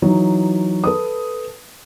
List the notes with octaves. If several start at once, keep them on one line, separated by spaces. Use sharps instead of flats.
E3 F#3 D#4
A4 B4 D#6